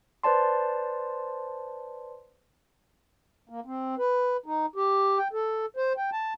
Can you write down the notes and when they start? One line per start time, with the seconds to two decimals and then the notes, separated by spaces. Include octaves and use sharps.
0.24 B4 C5 D5 A5 C6
3.49 A#3
3.66 C4
3.98 B4
4.46 D#4
4.76 G4
5.18 G5
5.33 A4
5.77 C5
5.97 G5
6.13 A5